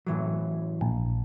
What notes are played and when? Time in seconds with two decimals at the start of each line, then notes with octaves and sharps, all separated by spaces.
0.07 A2 E3 F#3
0.81 A#1